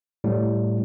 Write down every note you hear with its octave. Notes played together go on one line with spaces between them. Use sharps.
A2 G3 A3